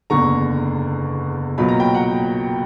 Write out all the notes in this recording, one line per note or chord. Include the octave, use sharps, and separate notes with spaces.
F#1 E2 D3 A#5 C#6
B1 A#2 F#3 B5
A#5
G5 B5
F#5 A#5